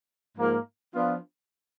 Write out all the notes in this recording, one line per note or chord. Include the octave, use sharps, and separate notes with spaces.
G#2 F3 A#3
F3 B3 D4 F4